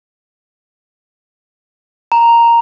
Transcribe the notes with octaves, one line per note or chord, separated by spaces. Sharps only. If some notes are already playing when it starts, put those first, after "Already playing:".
A#5